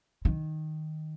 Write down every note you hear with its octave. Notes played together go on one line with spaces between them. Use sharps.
D#3